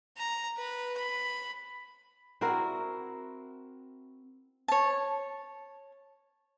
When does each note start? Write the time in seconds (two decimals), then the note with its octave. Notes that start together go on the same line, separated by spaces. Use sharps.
0.17 A#5
0.57 B4
0.97 B5
2.41 C4 E4 F#4 A#4
4.68 C#5 A5